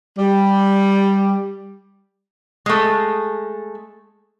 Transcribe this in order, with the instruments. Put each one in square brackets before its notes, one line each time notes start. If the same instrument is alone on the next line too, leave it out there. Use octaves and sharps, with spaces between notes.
[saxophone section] G3
[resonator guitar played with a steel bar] G#3 A3